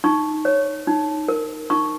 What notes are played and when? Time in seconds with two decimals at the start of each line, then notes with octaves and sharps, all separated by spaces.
0.04 D#4 C#6
0.45 C#5
0.87 D#4
1.28 A#4
1.70 D#4 C#6